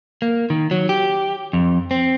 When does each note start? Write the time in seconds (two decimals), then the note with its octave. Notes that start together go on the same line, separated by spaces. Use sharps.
0.22 A#3
0.50 D#3
0.71 F#3
0.89 G4
1.53 F2
1.91 C4